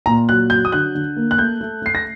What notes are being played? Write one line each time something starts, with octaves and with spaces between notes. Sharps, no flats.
A#2 A#5
F#3 F#6
F#3 G6
D#6
D3 F#6
D3
A#3
F#6
A3 G6
A3
A3 C7
A#6